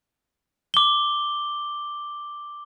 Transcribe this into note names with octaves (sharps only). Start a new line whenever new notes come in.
D6 G7